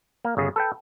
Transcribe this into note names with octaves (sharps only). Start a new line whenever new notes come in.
A#3
G1 C#3 G#4
A4 B4 G5